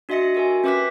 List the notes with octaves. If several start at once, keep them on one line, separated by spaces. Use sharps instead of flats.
D4 F#4 D#5 E5 A#6 C#7
F#4 G4 A#4 E5 G#5
C#4 B4 E5 D6 F#6 B6